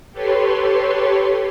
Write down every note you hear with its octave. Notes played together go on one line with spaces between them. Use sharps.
G4 A4 B4 C#5 C6